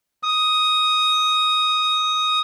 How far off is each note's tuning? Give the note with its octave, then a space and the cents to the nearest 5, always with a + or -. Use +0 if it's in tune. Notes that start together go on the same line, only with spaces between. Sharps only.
D#6 +5